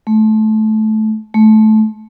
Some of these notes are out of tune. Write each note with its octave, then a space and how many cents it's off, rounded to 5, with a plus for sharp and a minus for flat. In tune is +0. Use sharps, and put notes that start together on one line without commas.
A3 -20
A3 -20